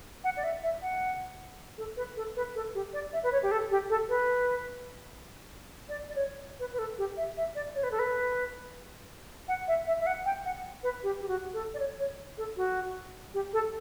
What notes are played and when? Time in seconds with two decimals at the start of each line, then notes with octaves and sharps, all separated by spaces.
0.24 F#5
0.37 D5
0.44 E5
0.63 E5
0.82 F#5
1.78 A4
1.97 B4
2.17 A4
2.36 B4
2.55 A4
2.75 G4
2.93 D5
3.13 E5
3.23 B4
3.33 C#5
3.43 G4
3.51 A4
3.71 G4
3.90 A4
4.09 B4
5.89 D5
6.08 D5
6.15 C#5
6.60 B4
6.73 B4
6.79 A4
6.98 G4
7.17 E5
7.37 E5
7.55 D5
7.75 C#5
7.83 B4
7.91 A4
7.99 B4
9.48 F#5
9.68 E5
9.87 E5
10.00 E5
10.06 F#5
10.26 G5
10.45 F#5
10.83 B4
11.03 G4
11.22 G4
11.28 F#4
11.54 A4
11.74 D5
11.80 C#5
12.00 C#5
12.38 A4
12.57 F#4
13.34 G4
13.53 A4